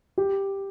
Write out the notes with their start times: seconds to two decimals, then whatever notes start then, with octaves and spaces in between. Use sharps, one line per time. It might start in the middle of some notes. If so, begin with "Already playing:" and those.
0.18 G4